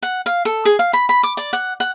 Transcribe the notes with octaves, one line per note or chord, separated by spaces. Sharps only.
F#5
F5
A4
G#4
F5
B5
B5
D6
D5
F#5
F#5